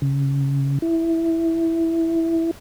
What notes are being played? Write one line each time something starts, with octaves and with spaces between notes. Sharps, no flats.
C#3
E4